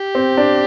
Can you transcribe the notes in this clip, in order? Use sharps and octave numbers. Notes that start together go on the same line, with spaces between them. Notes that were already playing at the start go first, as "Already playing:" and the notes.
Already playing: G4
C4
D4